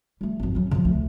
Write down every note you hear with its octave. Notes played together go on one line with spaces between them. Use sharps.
G3 A3
G#1 F#2
F#3 C#4
C#3 F3
D2 A3